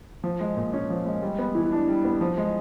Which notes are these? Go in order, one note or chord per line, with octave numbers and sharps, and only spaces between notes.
F3
G#3
A#2
C#4
F3
G#3
G3
B3
E3
D4
G3
B3
F3
G#3